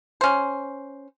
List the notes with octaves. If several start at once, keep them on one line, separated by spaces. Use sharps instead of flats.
C#4 C5